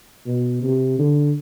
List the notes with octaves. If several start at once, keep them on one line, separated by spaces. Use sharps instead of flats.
B2
C3
D3